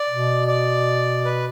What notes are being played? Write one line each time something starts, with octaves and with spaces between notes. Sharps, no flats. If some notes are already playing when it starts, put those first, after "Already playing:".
Already playing: D5
B2
D5
B4